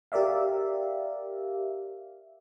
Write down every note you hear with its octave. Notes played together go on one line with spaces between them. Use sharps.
G4 A#4 D5 E5 F5